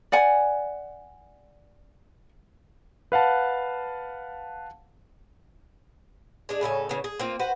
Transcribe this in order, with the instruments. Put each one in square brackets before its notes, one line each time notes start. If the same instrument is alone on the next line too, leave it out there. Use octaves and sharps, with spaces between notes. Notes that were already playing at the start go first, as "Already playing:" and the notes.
[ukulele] D5 F#5 G#5
[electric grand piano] B4 F5 F#5 A5
[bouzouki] G#3 D4 G#4
A2 C#3 A4 G#5
C#3 E3
G#4
A#3 C4 F4
F#4 B4 C5 F#5